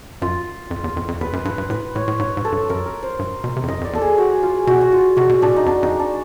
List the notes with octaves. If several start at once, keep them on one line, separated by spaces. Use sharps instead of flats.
F#2 F4
F2
E2
F2
F2
E2 B4
F#2
G2 B4
G2
A2 B4
A2 C#5
A2
G#2 C#5
G#2
A4
G2
F#2 A#4
A#4
C5
G2
B2
C3
F2
F#2 D#5
F2
D5
E2 A4
G#4
F#4
F4
B2 F#4
F#4
F4
C3 F#4
B2
A#2 D4
D#4
F2 D4
F2 D#4
D4